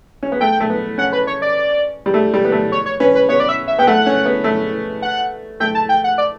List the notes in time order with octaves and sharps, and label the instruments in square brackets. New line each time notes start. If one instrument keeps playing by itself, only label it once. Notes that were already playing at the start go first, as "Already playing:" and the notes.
[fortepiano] C#4
B3
[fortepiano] A3 [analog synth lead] G5
[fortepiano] A3
B3
[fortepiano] C#4 [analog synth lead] F#5
[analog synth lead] B4
C#5
D5
[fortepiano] G3
A3
G3
B3
A3
[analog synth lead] C#5
C#5
[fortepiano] C#4 [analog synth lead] B4
[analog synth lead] B4
[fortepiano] B3 [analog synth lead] C#5
[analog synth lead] D5
E5
E5
[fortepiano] B3 [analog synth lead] G5
[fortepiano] A3 [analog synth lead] F#5
[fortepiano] C#4
B3
A3
[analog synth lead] F#5
[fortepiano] A3 [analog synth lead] G5
[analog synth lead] A5
G5
F#5
D5